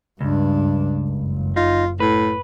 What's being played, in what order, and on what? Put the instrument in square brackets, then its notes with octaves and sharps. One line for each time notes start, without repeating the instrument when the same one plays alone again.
[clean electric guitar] C#2 [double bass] G2 D4
[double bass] F#1
[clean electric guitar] D#4 [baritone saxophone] F4
[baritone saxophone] A2 [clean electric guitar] B4